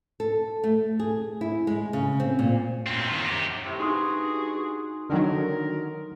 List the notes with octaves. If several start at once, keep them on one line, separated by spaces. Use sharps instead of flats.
A4
A3
G#4
E4
G#3
C#3
C4
A#2
F#2 C4
D#3 F4
F#2 G4
A2 C3
G2 D#4 F#4 G#4 C6 D#6
D3 D#3 F#3 A#4